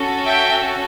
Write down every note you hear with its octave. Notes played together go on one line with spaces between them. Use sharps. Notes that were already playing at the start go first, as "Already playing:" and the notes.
Already playing: C#4 F#4 A4
E5 G5